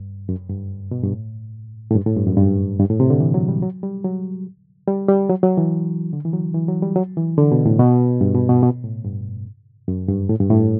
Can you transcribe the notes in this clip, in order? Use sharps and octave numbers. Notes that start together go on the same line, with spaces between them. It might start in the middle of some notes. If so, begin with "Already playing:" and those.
Already playing: G2
F#2
G2
B2
G2
A2
A2
G2
A2
G2
F#2
G2
G2
A2
C3
D3
E3
F#3
G3
F#3
G3
F#3
G3
G3
F#3
F#3
E3
D3
E3
F#3
E3
F#3
G3
F#3
E3
D3
B2
A2
B2
G2
B2
B2
B2
A2
G2
F#2
G2
A2
G2
A2